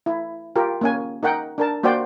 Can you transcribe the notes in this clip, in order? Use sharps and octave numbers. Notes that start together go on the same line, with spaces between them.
E4
F4 G4 A#4
A#3 C#4 G#5
D#4 A#4 F#5 G5
D4 A#4 A5
A#3 F#4 C5 D5 G5